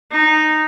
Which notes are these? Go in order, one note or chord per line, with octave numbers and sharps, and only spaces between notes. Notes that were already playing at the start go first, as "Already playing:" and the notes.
D#4